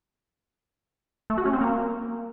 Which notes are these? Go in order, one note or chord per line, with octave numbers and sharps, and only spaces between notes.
A3
F#4
C#4
C4
A#3